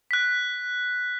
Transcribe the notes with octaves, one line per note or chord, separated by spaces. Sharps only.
F#6 B6